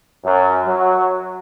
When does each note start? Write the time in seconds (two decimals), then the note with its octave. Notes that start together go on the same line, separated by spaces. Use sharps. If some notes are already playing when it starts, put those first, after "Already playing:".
0.24 F#2
0.65 F#3